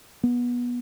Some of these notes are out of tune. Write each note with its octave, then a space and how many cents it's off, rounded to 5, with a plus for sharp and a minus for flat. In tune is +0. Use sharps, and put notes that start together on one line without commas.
B3 -20